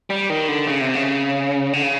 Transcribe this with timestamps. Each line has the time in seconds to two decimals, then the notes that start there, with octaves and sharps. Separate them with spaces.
0.10 G3
0.30 D#3
0.48 D3
0.67 C#3
0.81 C3
0.95 C#3
1.73 D3
1.83 C#3